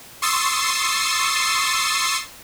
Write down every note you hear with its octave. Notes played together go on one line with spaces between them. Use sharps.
C6 C#6 D#6 E6 A6 C7